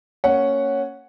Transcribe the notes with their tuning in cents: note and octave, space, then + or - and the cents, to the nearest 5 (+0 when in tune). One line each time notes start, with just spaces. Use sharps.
A#3 -25 C#4 +0 F#5 +0